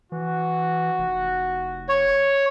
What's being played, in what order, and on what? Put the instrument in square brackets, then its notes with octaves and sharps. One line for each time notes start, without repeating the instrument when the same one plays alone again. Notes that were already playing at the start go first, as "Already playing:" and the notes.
[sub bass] E3 [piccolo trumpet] F#4
[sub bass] F1
[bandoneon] C#5